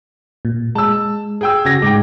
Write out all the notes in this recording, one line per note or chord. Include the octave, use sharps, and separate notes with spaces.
A#2
G#3 A5 E6
G#4 G5 E6
C#3 F#4 G#6 A#6
G#2 G#3 G5 D6